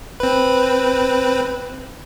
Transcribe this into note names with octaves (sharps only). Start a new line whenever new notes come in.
C4 B4